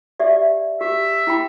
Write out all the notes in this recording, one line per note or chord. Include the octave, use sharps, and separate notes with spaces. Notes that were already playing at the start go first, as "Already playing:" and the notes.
G4 D5 E5
G4 E5
E4 G5 B5